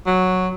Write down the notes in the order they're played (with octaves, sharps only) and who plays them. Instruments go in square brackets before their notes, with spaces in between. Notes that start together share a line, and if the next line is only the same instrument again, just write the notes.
[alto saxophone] F#3